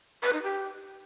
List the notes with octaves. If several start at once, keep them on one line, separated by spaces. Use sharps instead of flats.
B4
D#4
G4